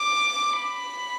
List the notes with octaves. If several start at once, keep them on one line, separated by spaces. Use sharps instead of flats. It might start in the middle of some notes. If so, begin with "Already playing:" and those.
Already playing: D6
B5